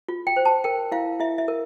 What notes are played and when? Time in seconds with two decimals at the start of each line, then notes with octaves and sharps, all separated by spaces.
0.08 F4
0.27 G5
0.36 C5
0.45 A5
0.64 A#4 G5
0.92 E4 F5
1.20 E4 E5
1.38 E5
1.48 A#4